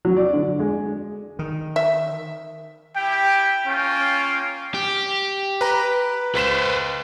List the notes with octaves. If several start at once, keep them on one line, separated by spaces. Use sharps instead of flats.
F#3
D5
D3
G#3
D#3
E5
E4 G4 G5
A#3 C#4 F4 G5
G4
B4 A#5
C#2 B4 C5 B6 E7